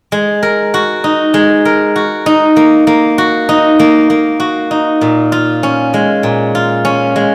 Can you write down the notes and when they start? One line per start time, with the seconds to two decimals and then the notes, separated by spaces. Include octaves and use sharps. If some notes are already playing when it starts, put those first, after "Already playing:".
0.12 G#3
0.43 A#4
0.74 F#4
1.04 D#4
1.34 G#3
1.65 A#4
1.96 F#4
2.26 D#4
2.56 A#3
2.87 A#3
3.18 F#4
3.49 D#4
3.79 A#3
4.10 A#3
4.40 F#4
4.71 D#4
5.01 A#2
5.32 F4
5.63 C#4
5.94 G#3
6.23 A#2
6.55 F4
6.85 C#4
7.16 G#3